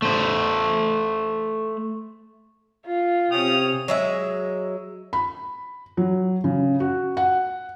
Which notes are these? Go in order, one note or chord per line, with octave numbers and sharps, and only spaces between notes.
A3 C5
F4
C3 C#4 G5 D#6 F7
F#3 G#3 E5
B5
F#3
C#3
F#4
F#5